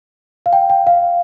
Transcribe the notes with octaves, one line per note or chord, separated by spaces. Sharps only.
F5
G5
G5
F5